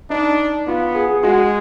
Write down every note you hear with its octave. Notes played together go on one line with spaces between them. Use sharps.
D4 D#4
B3 F4
G#4
G#4
G#3 F#4